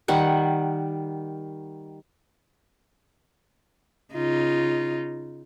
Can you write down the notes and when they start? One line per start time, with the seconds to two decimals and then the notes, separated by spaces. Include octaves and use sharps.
0.08 D#3 G3 F#5
4.14 C#3 D#4 F4